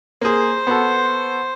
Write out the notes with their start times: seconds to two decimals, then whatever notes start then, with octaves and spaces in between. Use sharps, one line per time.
0.21 A#3 G#4 C5
0.67 B3 F#4 A4